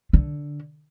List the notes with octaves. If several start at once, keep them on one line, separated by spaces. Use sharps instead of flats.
D3